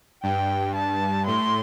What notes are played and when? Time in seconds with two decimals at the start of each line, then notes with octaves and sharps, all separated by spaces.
0.23 G2 G5
0.75 A5
1.27 A2 C6